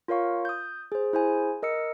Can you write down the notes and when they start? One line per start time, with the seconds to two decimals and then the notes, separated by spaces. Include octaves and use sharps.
0.08 F4 A#4 C#5 F5 C#6
0.45 D#6 G6
0.92 G#4 C5
1.13 E4 G#4 C5 G#5
1.63 A#4 D#5 E6 C#7